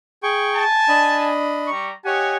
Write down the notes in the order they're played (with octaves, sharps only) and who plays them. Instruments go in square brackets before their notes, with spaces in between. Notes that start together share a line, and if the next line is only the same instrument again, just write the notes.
[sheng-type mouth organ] G#4 G5 C#6
[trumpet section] G#5 A5
[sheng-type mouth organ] D4 D#5 B5
[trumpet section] G3 A#5 C#6
[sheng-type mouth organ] G4 F#5 [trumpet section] C#5 D#5 G#5